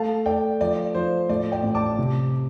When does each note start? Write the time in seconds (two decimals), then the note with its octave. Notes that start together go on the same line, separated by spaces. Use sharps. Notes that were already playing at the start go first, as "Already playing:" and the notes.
Already playing: A3 F5 A5
0.26 A3 D5 G5
0.61 F3 D5
0.95 F3 C5
1.29 A2 D5
1.52 D5 G5
1.63 A1
1.75 A5 D6
1.99 C3